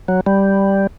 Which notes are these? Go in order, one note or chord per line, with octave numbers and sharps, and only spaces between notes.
F#3
G3